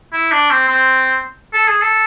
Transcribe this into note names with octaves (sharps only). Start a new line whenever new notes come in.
E4
D4
C4
C4
A4
G#4
A4